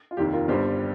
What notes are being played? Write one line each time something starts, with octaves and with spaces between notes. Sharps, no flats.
F4
F1 D#2 D#3 G4
F4 A#4
G1 G2 G3 G4 C5